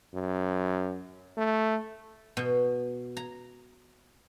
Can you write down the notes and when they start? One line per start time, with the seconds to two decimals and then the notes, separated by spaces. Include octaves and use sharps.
0.14 F#2
1.37 A3
2.37 B2
3.17 A#5